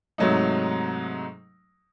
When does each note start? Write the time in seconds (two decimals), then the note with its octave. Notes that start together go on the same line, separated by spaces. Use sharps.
0.18 G#2 C3 F#3 A3 D#4